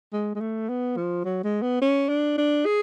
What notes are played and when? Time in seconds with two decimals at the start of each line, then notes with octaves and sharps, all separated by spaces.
0.13 G#3
0.35 G#3
0.40 A3
0.69 B3
0.97 F3
1.25 F#3
1.44 G#3
1.62 B3
1.81 C#4
2.09 D4
2.38 D4
2.65 G#4